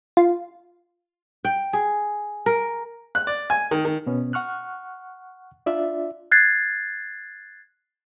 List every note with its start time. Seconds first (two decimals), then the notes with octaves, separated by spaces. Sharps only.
0.17 F4
1.45 G5
1.73 G#4
2.46 A#4
3.15 F#6
3.27 D5
3.50 G#5
3.71 D#3
3.85 D#3
4.07 B2 B3 C#4
4.33 F#5 C#6 F6 F#6
5.66 D4 F4 D5 E5
6.31 F#6 G#6 A6 C7